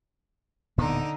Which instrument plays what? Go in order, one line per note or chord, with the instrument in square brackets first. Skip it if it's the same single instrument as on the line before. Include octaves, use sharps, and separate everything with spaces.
[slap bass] D1 A#2 B3 [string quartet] D3 D#4